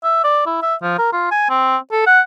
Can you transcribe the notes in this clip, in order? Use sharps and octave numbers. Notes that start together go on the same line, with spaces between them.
E5
D5
E4
E5
F3
A#4
F4
G#5
C4
A4
F#5